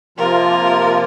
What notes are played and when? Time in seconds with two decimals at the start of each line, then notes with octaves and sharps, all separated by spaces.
0.17 C3 F3 A#3 F4 A#4